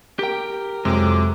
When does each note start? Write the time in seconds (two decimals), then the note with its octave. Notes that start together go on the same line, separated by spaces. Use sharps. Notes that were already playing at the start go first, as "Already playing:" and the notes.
0.19 G4 A#4 G5
0.85 F2 C3 F#3 G#3 D6